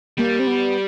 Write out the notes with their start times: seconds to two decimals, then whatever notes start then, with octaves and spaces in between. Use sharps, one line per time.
0.18 G3 A#3
0.39 C4
0.47 B3